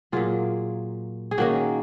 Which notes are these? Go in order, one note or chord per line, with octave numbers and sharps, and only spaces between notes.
A#2 F#3 A#3 F4 G#4
G#4
D#3 A#3 C#4 D#4 F#4